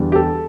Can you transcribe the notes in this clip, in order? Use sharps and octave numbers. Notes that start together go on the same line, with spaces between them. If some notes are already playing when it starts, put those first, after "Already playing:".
Already playing: E2 D3 G3
G4
A4